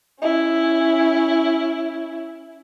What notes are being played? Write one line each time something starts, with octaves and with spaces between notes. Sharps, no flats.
C#4 E4